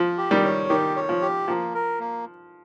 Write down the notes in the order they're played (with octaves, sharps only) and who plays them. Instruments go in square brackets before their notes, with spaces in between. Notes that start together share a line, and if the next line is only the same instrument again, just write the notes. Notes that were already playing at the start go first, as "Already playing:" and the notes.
Already playing: [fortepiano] F3
[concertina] G4
[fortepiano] D#3 G3
[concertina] C#5
[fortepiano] D#3 [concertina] G4
[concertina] C#5
[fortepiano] F3
[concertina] G4
[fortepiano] F3 [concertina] A#3
[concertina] A#4
A#3